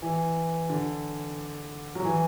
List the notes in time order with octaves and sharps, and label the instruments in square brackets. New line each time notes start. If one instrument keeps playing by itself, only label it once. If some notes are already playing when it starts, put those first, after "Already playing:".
[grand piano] E3
D3
F#3
E3